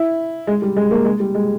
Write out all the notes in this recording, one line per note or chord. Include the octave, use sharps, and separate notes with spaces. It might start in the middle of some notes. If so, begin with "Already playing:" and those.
Already playing: E4
G#3
G3
G#3
A#3
G#3
G3
G#3